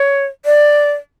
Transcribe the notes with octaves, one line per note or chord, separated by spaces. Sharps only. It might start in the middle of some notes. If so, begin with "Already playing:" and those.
Already playing: C#5
D5